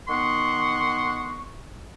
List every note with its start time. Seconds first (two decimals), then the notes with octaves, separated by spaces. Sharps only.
0.08 D#3 B3 F#5 C6 C#6